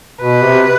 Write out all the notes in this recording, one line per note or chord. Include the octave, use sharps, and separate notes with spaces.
B2 B4
C3